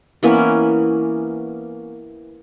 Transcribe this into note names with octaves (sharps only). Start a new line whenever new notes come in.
E3 A#3 B3 C#4